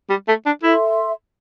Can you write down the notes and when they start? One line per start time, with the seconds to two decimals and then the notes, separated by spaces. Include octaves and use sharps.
0.10 G3
0.28 A3
0.46 D4
0.62 E4 A4 E5 C6